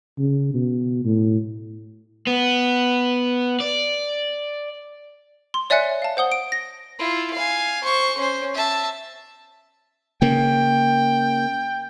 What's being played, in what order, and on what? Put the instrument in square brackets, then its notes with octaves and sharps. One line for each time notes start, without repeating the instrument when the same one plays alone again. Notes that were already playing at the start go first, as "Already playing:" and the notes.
[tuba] C#3
B2
A2
[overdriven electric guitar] B3
D5
[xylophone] C6
C#5 D5 E5 G#5 F#6 C#7
F5 A5
C5 F#5 D#6 G7
D7
A#6
[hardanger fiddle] E4 F4
F5 G#5
C5 C#6
C#4 C5
E5 A5
[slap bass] C#3 A#3 [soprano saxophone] G5